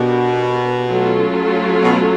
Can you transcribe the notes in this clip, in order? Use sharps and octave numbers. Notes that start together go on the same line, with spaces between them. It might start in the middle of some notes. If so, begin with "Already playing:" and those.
Already playing: B2 B3 D4 G4 A#4
F#3 A3 C#4 F4 A4
B2